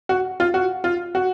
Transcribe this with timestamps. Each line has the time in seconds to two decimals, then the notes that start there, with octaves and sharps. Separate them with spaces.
0.09 F#4
0.40 F4
0.54 F#4
0.84 F4
1.15 F#4